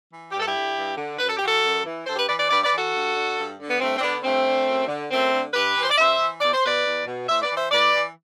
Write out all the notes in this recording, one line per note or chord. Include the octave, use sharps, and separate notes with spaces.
E3
G2 G4
A4
E4 G4
D3
G2
D3
F#2 B4
A4
E3 G4
F#4 A4
F#2
E3
G2 A4 C5
G4 B4
E3 B4 D5
B4 D5
G2 B4 D5
B4 D5
E3
F#4 A4
G2
D3
G2
D3
B3
G2 A3 C4
C4
D3 B3 D4
G2 A3 C4
D3
F#2
D3
F#2 A3 C4
D3
G2 G4 B4
E3
C5
D5
G2 C5 E5
E3
E2 D5
C5
B2 B4 D5
E2
B2
A2 C5 E5
B4 D5
E3
C5 E5
A2 B4 D5
E3